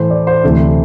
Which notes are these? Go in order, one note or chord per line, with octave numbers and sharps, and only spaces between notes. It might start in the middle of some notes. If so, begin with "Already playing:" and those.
Already playing: A2 E3 A3 C5
D5
C5
D2 C3 E3 A3 A4